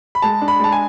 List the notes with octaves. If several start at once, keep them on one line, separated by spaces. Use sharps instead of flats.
B5
G#3 A5
D4
B5
G#3 A5
G#5